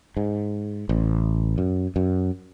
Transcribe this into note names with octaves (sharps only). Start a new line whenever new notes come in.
G#2
A1
F#2
F#2